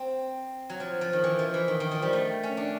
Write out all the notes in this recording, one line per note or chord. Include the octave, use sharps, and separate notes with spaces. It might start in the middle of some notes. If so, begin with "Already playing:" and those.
Already playing: C4
F#3
F3
F3
D#3
E3
F3
E3
D#3
D#3
F3
G3
A3
C#4
D4